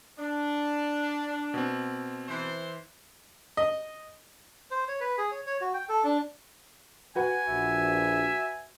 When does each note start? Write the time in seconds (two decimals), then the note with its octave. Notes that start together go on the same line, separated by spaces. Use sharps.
0.17 D4
1.54 B2 C4
2.27 E3 C5
3.57 D#5
4.71 C5
4.88 C#5
5.00 B4
5.18 G#4
5.31 C#5
5.46 C#5
5.61 F#4
5.74 G5
5.89 A4
6.04 D4
7.15 F#4 B4 F#5 G#5
7.48 A#1 E5